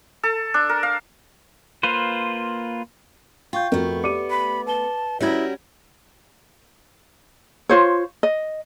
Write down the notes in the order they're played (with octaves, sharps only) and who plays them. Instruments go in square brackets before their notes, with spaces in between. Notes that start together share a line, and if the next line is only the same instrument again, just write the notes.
[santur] A4
D4
A#4
F5
[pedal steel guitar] A#3 F4 B4 C5
[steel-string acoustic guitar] F4 [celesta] G5 C#6 G6
[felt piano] F2 F#4 A#4 [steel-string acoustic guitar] A3 B3
[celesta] G4 D5 C#7 [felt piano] D6 D#7
[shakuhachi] B5
[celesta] B4 G7 [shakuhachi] A5
[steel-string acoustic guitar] G3 F#4 A#4 [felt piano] C#4 G4 G#6 [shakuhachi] E4
[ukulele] F4 C5 C#5
D#5